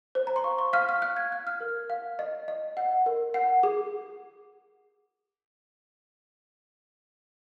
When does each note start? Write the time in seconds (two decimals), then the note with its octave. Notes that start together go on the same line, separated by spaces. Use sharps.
0.15 C5
0.27 A#5
0.36 C6
0.44 F5 C#6
0.59 C#6
0.73 F5 F6
0.89 F6
1.02 F5 F#6
1.17 G#6
1.32 F5 F#6
1.47 F6
1.60 A#4
1.90 F5
2.19 D#5
2.48 D#5
2.77 F#5
3.06 A#4
3.34 F#5
3.63 G#4